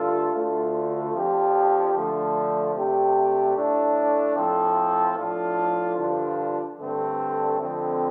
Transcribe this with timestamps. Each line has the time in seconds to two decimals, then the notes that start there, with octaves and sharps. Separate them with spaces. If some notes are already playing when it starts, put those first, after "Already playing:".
Already playing: G2 D3 A3 F4 A4
0.33 D2 D3 A3 F4
1.13 F2 F3 D4 G4
1.94 D3 F3 A3 D4
2.75 C3 A3 D4 G4
3.55 A2 A3 D4
4.36 A2 F3 C4 A4
5.17 A2 F3 D4 F4 A4
5.98 G2 D3 F3 D4 F4
6.79 G2 D3 A3 C4 A4
7.59 F2 D3 A3 C4